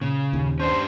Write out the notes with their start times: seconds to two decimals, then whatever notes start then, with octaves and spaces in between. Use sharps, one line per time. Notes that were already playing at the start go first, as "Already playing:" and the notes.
0.01 A#2 C#3
0.33 D#2
0.60 C#4 D4 G4 C5 A5